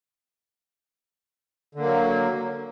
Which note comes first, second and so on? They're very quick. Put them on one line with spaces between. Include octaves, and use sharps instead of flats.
D3 A#3 F#3